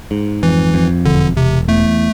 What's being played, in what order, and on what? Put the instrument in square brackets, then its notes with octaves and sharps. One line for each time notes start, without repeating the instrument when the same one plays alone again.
[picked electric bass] G#2
[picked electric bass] F2 [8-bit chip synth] E3
[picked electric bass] F2
[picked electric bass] E1 [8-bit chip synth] D3
[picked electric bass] E1 [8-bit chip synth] C3
[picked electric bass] E2 [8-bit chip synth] A3